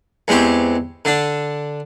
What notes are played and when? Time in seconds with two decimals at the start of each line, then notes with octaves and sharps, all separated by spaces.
0.28 E2 G#3 C4 G4 C#6
1.05 D3 D4